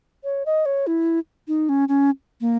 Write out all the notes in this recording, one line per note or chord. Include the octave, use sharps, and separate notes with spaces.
C#5
D#5
C#5
E4
D#4
C#4
C#4
A#3